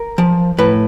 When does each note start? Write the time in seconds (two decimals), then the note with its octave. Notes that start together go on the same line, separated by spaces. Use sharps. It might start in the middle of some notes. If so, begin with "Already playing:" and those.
Already playing: A#4
0.18 F3
0.58 A2 B4